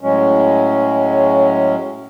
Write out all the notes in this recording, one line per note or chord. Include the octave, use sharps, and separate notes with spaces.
A2 F#3 G#3 C#4